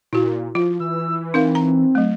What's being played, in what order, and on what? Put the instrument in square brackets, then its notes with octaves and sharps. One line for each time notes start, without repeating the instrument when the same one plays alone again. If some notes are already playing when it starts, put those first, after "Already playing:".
[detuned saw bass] A#2 [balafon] E4 F#4
[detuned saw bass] F3 [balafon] F4
[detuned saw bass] E3 [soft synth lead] E6
[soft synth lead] C4 [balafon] D#4 A#4 F5
[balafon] A#5
F#3 A3